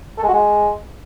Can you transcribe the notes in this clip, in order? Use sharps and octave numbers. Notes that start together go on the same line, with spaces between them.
A4
G#3
F#4
G#3